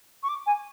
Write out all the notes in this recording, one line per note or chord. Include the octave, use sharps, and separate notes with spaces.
C#6
D6
G#5